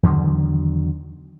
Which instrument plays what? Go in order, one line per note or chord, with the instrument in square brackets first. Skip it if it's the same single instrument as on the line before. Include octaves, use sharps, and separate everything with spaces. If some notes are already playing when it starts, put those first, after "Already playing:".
[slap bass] E2 D3 D#3 F#3